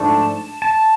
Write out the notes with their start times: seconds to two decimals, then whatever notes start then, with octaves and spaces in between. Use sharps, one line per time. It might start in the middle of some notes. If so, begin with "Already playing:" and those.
Already playing: G#2 F3 A3 D4 A5
0.62 A5